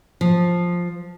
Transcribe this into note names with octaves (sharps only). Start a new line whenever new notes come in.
F3